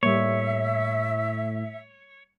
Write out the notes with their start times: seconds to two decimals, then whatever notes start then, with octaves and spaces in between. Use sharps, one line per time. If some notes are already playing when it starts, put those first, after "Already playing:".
0.03 A2 G3 A#3 C#5 E5